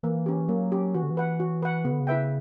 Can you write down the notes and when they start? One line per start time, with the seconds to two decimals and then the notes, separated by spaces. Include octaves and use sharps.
0.03 E3 A#3
0.26 C#4 G4
0.48 F#3 A#3
0.72 C#4 G4
0.94 E3 F#4
1.03 D3
1.11 E3
1.17 B4 F#5
1.40 F#4
1.62 B4 F#5
1.85 C#3 B3
1.92 D3
2.00 C#3
2.07 E4 B4 E5 G5